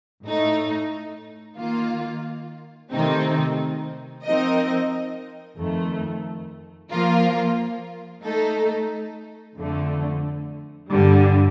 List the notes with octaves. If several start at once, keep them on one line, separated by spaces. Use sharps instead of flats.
A2 A3 D#4
D#3 A#3 F4
C3 D#3 A3 C4 D#4
F3 C4 D#4 A#4 D#5
F2 D#3 A3
F3 A#3 F4 A#4
A3 D#4 A4
F2 D3 A3
G2 D3 G3